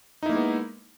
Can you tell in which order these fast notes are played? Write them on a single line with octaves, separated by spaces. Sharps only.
D#4 E4 A#3 G#3 B3